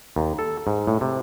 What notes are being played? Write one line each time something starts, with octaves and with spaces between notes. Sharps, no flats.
D#2
A4
G#2
A2
C3